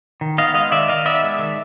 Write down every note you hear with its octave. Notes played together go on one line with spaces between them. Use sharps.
D#3
B3 D#5 F5
G#3 D#5 F5
D#3 D5 E5
D#3 D#5 F5
B3 D5 E5
G#3
D#3